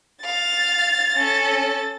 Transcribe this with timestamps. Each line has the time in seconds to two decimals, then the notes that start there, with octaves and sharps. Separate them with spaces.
0.25 F5 A6
1.15 C#4 A4